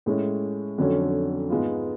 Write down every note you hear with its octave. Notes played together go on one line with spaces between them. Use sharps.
A2 G#3 C#4
F2 D3 F#3 C#4
G#2 G#3 B3 F4